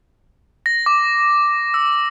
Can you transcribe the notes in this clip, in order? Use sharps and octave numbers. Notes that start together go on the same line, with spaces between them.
A#6
D6
E6